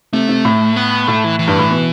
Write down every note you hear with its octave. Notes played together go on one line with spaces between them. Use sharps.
C3 A3
C3
A2
B3
A2 A3
E3
E3
G2
A2
B2